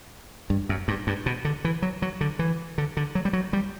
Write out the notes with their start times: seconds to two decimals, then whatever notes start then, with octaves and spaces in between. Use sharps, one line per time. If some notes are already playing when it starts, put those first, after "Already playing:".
0.50 G2
0.69 F#2
0.88 G2
1.07 G2
1.26 B2
1.45 D3
1.65 E3
1.82 F#3
2.02 F#3
2.21 D3
2.39 E3
2.78 D3
2.97 D3
3.15 F#3
3.25 G3
3.33 F#3
3.53 G3